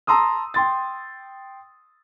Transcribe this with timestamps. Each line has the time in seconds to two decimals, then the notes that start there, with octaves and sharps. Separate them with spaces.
0.07 A5 A#5 C6 D#6 E6
0.54 G5 C6 A6